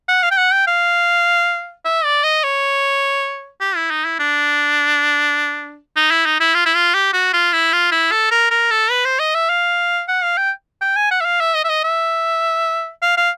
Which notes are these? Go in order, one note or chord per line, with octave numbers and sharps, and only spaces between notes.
F#5
F5
G5
F#5
G5
F5
E5
D5
D#5
C#5
G4
E4
D#4
E4
D4
D#4
E4
D#4
E4
F4
E4
F4
G4
F#4
F4
E4
F4
E4
A4
A#4
A#4
A4
B4
C5
D#5
E5
F5
F#5
F5
G5
G5
G#5
F#5
E5
F5
E5
D#5
E5
D#5
E5
F5
F5